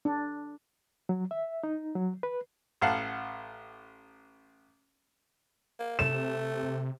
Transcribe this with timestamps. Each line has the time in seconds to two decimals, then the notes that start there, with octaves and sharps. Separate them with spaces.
0.05 D4
1.09 F#3
1.31 E5
1.64 D#4
1.95 F#3
2.23 B4
2.81 A1 F5 F#5 A5
5.79 A#3
5.99 C3 A3 E7